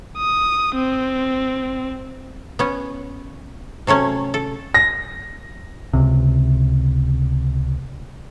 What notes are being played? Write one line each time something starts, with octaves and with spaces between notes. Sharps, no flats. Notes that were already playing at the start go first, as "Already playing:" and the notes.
D#6
C4
B3 C#4
C3 F#3 A3 C#4
A4
A#6
C#2 C3